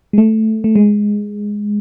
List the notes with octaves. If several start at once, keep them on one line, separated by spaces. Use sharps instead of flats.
G#3
A3
A3
G#3